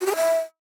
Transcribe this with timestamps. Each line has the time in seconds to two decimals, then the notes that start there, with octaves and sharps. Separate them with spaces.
0.01 F#4
0.06 G4
0.11 G#4
0.16 E5